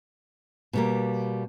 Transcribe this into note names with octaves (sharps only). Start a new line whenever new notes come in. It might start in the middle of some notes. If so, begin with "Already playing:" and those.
B2 G3 A#3